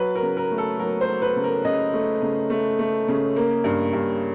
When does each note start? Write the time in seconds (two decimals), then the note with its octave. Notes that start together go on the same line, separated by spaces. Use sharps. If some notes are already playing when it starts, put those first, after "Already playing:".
Already playing: F#3 B4
0.15 A#4
0.22 C#3
0.37 A#4
0.51 A3
0.58 A4
0.79 F#3 A#4
1.01 C5
1.08 F#3
1.22 B4
1.36 C#3
1.44 A#4
1.65 C#3 D#5
1.93 A3
2.22 C#3
2.50 A3
2.79 A3
3.08 C#3
3.36 A#3
3.64 G2
3.93 G2